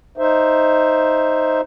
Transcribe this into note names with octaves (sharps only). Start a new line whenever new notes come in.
D#4 C5 E5